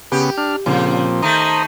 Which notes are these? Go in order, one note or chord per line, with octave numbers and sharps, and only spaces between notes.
C#3 B3 G4
D4 F6
A#2 C#3 F3 C4
D#3 A3 C5 A#5 D#6